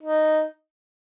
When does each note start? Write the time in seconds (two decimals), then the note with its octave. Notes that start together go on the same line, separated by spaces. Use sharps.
0.03 D#4